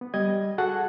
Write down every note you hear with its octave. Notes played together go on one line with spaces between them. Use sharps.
B3
G3 D#5 G#6
F#4 G#4 A4 F#5 A5